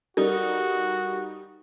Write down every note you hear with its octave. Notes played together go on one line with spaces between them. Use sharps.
G3 D#4 F#4 A4 A#4